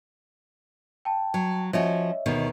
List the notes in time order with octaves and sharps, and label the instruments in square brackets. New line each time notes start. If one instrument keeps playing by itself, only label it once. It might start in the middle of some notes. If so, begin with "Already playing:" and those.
[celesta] G5 A5
[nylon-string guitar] F#3
[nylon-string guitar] F3 C#4 F#4 [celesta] C#5 D#5 E5
[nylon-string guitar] D2 B2 D#3